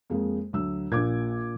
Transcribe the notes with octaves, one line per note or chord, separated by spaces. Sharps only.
F2 G#3 A#3
D2 F#3 E6
A#1 A#2 D6 G#6